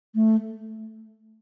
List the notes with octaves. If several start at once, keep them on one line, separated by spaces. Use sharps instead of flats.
A3